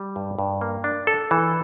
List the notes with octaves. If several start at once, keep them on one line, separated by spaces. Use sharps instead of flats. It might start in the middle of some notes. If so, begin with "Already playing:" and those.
Already playing: G3
G2
G2
A#3
D4
A4
E3